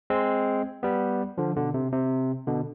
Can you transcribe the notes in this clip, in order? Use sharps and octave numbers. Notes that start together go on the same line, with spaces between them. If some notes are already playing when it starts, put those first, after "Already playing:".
G#3 C4
G3 B3
D3 F3
B2 D3
C3
C3
B2 D3